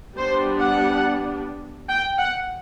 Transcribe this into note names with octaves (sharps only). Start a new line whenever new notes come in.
G3 B3 D4 C5
F#5
G5
F#5